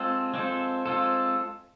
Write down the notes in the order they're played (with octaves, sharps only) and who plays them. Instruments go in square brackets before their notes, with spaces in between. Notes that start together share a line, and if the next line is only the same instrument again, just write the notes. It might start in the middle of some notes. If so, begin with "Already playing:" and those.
Already playing: [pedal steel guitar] G#3 C4 F4 A4
G#3 C4 F4 A4
G#3 C4 F4 A4